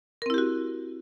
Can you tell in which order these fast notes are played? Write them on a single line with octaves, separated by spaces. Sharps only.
A#4 C4 E4 G4 F#4